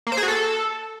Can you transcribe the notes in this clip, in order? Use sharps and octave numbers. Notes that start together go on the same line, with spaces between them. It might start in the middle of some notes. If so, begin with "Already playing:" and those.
A#3
C5
G#4
F#4
A4